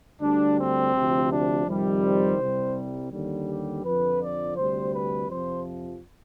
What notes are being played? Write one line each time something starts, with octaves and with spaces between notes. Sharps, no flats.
D2 D3 G3 D4
C4
D2 C3 F3
D4
F2 C3 D#3 G3
C5
C2 C3 G3
D#2 D3 G3
G4
F2 D3 F3 B4
D5
D2 C3 G3 C5
B4
F2 C3 F3 C5